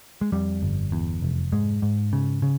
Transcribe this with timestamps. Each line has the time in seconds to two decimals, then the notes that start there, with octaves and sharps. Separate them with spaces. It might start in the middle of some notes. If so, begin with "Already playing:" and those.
0.21 G#3
0.32 F2 G3
0.62 G1
0.92 E2
1.22 F1
1.52 G#2 G#3
1.82 G#2
2.13 C#3
2.42 C#3